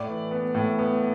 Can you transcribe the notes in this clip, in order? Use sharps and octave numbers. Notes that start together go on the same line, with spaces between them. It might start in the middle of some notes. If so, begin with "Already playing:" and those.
Already playing: A2 D5
E3
B3
A2
B3